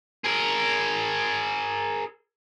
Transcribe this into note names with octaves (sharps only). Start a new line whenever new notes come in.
G#4 A#4